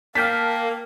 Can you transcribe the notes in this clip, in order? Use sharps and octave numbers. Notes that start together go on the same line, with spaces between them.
A#3 A#4 F5 G5 A5 B6